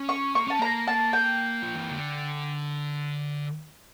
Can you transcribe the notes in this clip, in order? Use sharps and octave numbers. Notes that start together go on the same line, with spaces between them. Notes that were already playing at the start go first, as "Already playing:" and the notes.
Already playing: C#4
C#6
A#3 C#6
C#4 A5
A#3 A#5
A5
G5
F3
E3
D3